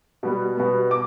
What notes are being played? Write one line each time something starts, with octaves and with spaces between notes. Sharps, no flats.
B2 G3 B3
B2 G3 B3
D6